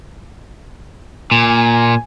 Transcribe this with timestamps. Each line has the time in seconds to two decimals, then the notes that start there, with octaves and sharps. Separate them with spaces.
1.32 A#2 G#5